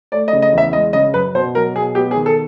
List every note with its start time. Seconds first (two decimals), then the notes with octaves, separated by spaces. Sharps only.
0.12 A3 D5
0.28 D#5
0.33 C#3
0.42 D#5
0.53 E2
0.58 E5
0.73 G#3 D#5
0.93 C#3 D#5
1.14 F#2 B4
1.35 B2 C5
1.55 F#3 A#4
1.75 B2 G#4
1.95 B3 G4
2.11 G#4
2.16 D#3
2.26 A4